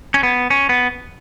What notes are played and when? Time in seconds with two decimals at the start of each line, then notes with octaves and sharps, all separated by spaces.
0.14 C#4
0.23 B3
0.50 C#4
0.69 B3